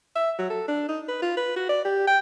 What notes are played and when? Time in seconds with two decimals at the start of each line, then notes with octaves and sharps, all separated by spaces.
0.15 E5
0.38 F#3
0.50 A4
0.68 D4
0.88 D#4
1.08 B4
1.22 F4
1.37 B4
1.56 F#4
1.69 D5
1.85 G4
2.07 G5